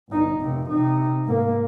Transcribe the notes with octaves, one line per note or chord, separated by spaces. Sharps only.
G1 D#4
F1 C3
C3 D#4
G#2 A#3